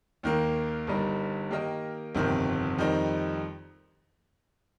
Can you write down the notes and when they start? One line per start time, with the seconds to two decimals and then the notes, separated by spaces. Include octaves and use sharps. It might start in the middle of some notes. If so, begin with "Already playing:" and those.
0.23 D#2 D#3 A#3
0.87 G1 G2 G3 D#4 A#4
1.50 D#3 A#3 G4 A#4 D#5
2.15 G1 F2 C3 D#3 C4
2.78 F2 D#3 G3 C4 D#4